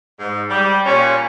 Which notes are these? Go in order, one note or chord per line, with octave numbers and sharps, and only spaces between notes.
G#2
G3
A#2 C#4